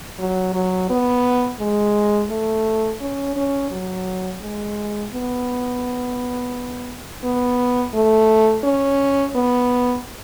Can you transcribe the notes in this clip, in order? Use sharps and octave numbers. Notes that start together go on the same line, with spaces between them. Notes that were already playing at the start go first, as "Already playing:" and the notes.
F#3
F#3
B3
G#3
A3
C#4
C#4
F#3
G#3
B3
B3
A3
C#4
B3